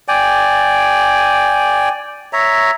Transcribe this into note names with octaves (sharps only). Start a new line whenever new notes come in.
D5 G5 G#5
C#5 E5 A#5